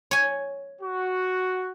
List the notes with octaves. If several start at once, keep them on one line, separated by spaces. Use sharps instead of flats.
C#5 G#5
F#4